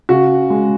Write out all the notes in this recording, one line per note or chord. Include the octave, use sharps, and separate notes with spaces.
C#3 F#4
G#3